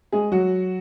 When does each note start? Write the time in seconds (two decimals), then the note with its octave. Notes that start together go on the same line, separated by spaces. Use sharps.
0.12 G#3 G#4
0.32 F#3 F#4